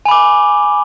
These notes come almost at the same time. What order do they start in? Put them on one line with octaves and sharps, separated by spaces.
G#5 B5 D6